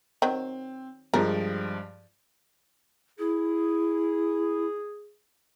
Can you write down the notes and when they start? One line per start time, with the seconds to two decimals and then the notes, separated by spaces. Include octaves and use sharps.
0.22 D#3 F#3 C4
1.14 G2 F3 G#3 A#4
3.19 E4 G#4